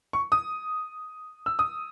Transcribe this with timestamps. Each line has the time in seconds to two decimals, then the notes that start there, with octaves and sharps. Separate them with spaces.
0.13 C#6
0.32 D#6
1.46 E6
1.59 D#6